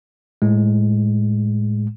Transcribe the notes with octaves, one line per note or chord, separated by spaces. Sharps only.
A2 G#3